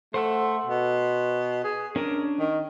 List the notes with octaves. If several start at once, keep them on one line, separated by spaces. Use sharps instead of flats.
A3 C5 F#5 E6
B2
G#4
C#4 D4 A#4
D#3